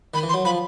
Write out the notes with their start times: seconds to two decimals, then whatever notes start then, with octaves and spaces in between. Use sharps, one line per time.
0.14 D#3 B5
0.23 E3
0.29 C6
0.34 F#3
0.45 F3 B5